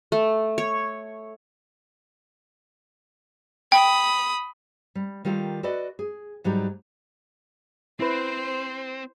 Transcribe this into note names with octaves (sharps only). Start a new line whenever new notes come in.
A3
C#5
G5 B5 D#6
G3
D#3 G3 F4 A4 A#4
F#4 A4 B4 D5 D#5
G#4
G#2 F#3 G3 D#4
C4 E4 B4 C5